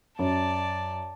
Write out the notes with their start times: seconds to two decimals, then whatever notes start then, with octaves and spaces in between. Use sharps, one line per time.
0.19 F#2 D5 A5